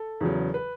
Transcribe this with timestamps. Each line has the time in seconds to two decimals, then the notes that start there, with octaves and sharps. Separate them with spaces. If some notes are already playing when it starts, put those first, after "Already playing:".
Already playing: A4
0.21 E2 C#3 F#3
0.54 B4